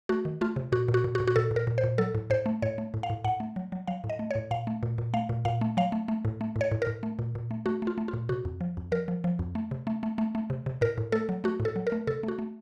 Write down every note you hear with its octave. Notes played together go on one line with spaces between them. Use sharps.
A3 F#4
D#3
A3 F4
C3
A#2 F#4
A#2
F#4
A#2
F#4
A#2
F#4
A#2 A4
A#2
A#4
A#2
C5
A#2
F#3 A4
A2
A2 C5
A3
A2 C#5
A3
A2
F5
A2
A2 F#5
A3
F#3
F#3
F#3 F5
A2
D#5
A3
A2 C#5
A#2 F5
A3
A#2
A#2
A3 F5
A#2
A#2 F5
A3
F#3 F5
A3
A3
A2
A3
A2
C#5
A2
A#4
A2
A3
A#2
A#2
A3
A3 F#4
A3 F4
A3
F4
A#2
C3 F#4
F2
F3
F2
F3 A#4
F3
F3
F2
A3
C3
A3
A3
A3
A3
C3
C3
A2 A#4
A2
A3 A4
F#3
A3 F#4
A2
A4
F#3
A#4
A3
C3 A4
A3
F#4
A3